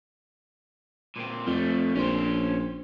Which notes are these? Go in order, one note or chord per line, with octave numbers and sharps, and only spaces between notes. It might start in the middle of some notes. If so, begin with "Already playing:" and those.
A#2 C4
F2 F3 A3
A#1 C#4 C5